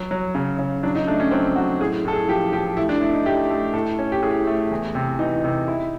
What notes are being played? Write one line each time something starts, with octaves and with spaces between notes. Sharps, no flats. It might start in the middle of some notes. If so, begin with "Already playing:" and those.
Already playing: F#3
F#3
C#3
C#3
F#3 D4
D#4
A3 D4
C#4
F#3 C4
F#3 F#4
A2 G#4
A2 A4
G#4
F3 G4
F3 G4
A3 E4
D4
A3 E4
D#4
A3 G4
A3
A2 A4
C#4
G4
A2 G#4
A3
E2
C3
E3 D#4
C3
E4